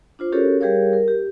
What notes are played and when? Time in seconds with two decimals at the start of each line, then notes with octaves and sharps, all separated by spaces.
0.19 D4 F4 C5
0.32 C#4 F#4 G4 A4 A#4 C#5
0.60 G3 G4 G#4 A#4 C#5 F5
0.93 A#4
1.08 G4